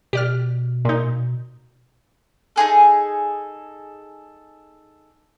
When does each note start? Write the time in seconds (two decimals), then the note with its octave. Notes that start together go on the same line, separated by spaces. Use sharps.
0.13 B2 G4 D5 F6
0.85 A#2 D#4
2.56 D#4 F4 G#4 A4